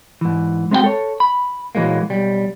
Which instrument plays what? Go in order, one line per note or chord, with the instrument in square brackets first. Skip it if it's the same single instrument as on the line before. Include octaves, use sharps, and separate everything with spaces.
[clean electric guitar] G#2 E3
G#3 C4 D4 E4 F#4 G5
A4 C#5
B5
A#2 E3 F#3 G#3 A#3
B1 G3